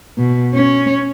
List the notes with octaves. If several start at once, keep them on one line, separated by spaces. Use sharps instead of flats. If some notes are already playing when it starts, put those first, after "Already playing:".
B2
C#4